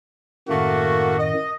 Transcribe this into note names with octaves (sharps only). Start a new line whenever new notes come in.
F#2 A2 D#3 A3 A#3 F#4
D#5